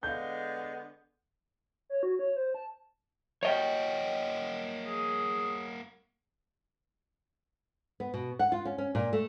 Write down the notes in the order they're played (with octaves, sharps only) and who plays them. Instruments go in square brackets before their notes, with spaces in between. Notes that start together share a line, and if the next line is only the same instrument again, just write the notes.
[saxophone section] D3 G#3 B3 [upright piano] F5 G6
[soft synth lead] C#5
F#4
C#5
C5
A5
[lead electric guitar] A#3 F#4 [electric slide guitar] C#5 D#5 G5
[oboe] G#4
[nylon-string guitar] B3
B2
F#5
F4
C#4
C#4
A#2
A3